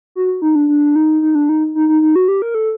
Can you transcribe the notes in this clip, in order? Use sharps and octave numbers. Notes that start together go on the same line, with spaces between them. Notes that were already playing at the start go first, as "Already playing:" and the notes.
F#4
D#4
D4
D4
D#4
D#4
D4
D#4
D#4
D#4
D#4
F#4
G4
A#4
A4